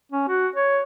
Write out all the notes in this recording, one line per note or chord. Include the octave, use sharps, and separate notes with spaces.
C#4
F#4
C#5